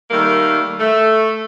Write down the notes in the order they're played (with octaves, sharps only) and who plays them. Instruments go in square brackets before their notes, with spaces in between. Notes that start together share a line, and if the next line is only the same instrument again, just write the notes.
[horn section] D#3 G3 A3 A#3
A3